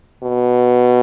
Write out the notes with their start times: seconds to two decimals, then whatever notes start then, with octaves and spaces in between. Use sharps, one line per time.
0.23 B2